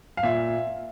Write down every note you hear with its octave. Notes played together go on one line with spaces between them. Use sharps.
F5
A#2 E5